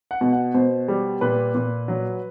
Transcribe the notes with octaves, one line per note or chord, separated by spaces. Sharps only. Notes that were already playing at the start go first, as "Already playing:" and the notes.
F#5
B2
F#5
B2 C5
G3
A#2 B4
A#2
F#3